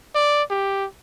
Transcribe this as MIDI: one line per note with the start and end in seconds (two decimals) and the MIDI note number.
0.15 0.43 74
0.50 0.86 67